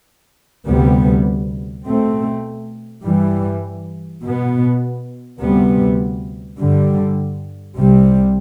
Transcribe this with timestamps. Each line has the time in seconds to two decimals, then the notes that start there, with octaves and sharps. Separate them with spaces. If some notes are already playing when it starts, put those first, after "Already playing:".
0.67 D2 C3 G3 B3
1.86 B2 A3 C4
3.04 G2 E3 G3
4.24 B2 B3
5.41 D2 C3 G3 B3
6.59 G2 D3 G3
7.78 C2 C3 G3